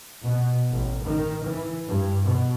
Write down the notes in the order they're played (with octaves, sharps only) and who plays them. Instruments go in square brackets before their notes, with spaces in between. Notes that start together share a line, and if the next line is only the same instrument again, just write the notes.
[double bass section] B2
A1
D#3
E3
G2
B2